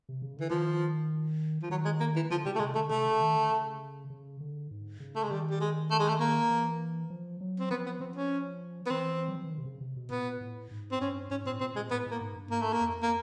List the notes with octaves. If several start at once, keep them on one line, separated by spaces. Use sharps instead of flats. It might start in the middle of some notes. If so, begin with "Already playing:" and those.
C3
C#3
D3 E3
D#3 F3
F3
D#3 F#3
G#3
A#3
E3
D3 F3
C#3 G3
A3
C3 G#3
D3 A3
C3 A3
C#3
D#3
D3
C#3
C#3
D3
G#2
C#3
A3
G#3
D#3 G3
G3
G#3
A3
G#3
A3
A#3
E3
F3
F#3
C4
F3 B3
B3
F3 C4
C#4
B3
E3 C4
F#3
F3
E3
D#3
C3
C#3
C3
B2
A#2 B3
A2
G#2
C4
G2 C#4
G#2 C#4
A2 C4
A#2 C4
A#2 G#3
A2 B3
A2 A#3
G#2
G2
G#2 A#3
A3
A#3
F2
A#3